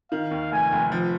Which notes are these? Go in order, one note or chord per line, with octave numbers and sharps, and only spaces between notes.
D#3 F5
D#2
F1 G#5
F1
F3